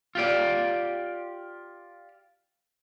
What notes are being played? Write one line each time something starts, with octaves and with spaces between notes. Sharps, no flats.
F4 G4 D5